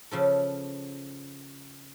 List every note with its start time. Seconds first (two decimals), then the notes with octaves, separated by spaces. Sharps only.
0.11 C#3 F3 A4